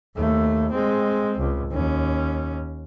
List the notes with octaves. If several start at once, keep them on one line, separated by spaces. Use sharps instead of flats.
D#2 A3
G#3 C4
C#2
D#2 C#4